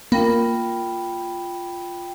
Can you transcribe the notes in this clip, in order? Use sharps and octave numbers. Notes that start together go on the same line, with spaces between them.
A#3 F4 G5 B5